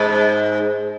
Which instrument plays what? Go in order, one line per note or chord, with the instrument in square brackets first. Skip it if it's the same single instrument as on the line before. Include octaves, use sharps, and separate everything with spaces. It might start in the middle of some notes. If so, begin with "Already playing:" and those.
Already playing: [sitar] G#2